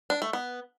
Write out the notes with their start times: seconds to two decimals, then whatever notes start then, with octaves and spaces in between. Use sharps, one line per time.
0.10 D4
0.22 A3
0.33 B3